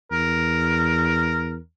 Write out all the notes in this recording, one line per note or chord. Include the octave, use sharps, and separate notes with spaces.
E2 A#4